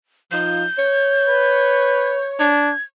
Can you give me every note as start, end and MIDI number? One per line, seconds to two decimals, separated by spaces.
0.31 0.64 53
0.31 0.64 63
0.31 0.64 65
0.31 2.26 91
0.78 2.49 73
1.27 2.23 71
2.39 2.73 62
2.39 2.82 92